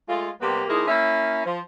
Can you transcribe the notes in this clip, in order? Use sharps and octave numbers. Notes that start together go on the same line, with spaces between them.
G#3 A3 F4
C3 G3 A#3 B3 G4
F3 A#3 D#4 E4 G#4
A#3 C#4 E4 E5
F3